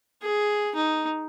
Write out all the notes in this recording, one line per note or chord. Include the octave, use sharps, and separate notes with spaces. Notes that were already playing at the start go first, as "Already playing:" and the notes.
G#4
D#4